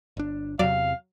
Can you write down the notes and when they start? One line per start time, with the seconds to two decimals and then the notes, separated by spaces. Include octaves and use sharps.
0.17 G1 D4
0.59 E2 C3 F#3 D5 F5